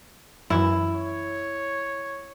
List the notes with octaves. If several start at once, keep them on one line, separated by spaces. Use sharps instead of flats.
F#2 E3 E4
C#5